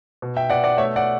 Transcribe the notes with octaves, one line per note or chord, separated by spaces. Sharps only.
B2
E5 G5
B2 D5 F#5
D5 F#5
A3 C#5 E5
D5 F#5